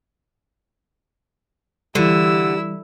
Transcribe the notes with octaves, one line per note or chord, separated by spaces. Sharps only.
D3 E3 G3 E4 G4 E6